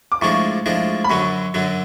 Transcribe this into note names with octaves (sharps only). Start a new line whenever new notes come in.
D6
A2 F3 G#3 D4 C#6
A2 F3 G#3 D4
B5
F#2 D3 F#3 C#6
F#2 D3 F#3